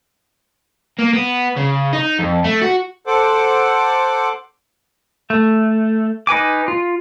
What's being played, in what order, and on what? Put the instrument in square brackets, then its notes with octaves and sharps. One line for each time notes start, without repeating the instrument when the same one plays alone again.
[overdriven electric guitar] A#3
B3
C#3
D#4
F2
A3
F#4
[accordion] A4 C5 F#5 D6
[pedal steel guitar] A3
D#4 B4 G#5 D6
F4